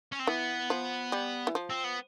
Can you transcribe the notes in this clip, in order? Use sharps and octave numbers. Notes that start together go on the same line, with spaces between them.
C#4
C4
E3 B3
F3
G3
E3
F3
C4
B3